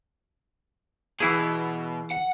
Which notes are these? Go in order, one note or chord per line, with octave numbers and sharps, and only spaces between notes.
B2 E3 E4 G#4
F#5